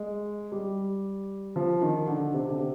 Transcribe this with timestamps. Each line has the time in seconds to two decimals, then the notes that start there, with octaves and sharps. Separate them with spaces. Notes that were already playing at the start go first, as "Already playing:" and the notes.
Already playing: G#3
0.52 G3
1.56 F3
1.82 D#3
2.07 D3
2.33 C3
2.49 D3
2.60 C3